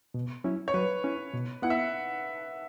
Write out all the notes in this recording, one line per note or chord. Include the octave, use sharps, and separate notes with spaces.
B2
F#3 C#4 E4
C#5
F#3 B4
C#4 E4
B2
B3 E4 F#5
E5